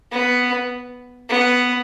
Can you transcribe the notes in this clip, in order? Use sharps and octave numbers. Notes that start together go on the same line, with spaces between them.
B3
B3